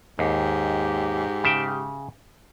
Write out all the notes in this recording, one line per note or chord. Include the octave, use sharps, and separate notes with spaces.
D#2 G#2 G4
C#3 E5 G5